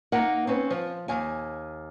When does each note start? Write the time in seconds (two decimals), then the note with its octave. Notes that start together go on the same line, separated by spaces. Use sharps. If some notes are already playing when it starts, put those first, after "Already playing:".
0.12 A#3 D#4 A#4 F#5
0.47 C4 C#4 B4
0.70 F3
1.08 D#2 G#5